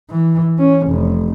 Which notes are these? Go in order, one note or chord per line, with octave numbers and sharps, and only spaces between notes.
E3
C#4
F1